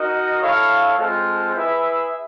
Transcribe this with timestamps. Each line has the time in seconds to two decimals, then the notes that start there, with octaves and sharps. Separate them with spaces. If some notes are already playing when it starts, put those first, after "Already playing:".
Already playing: D#4 F#4 A#4 D#5
0.41 E4 A4 C#5 F5
0.98 G#3 C4 F4 A4 C5
1.55 E4 G#4 B4 E5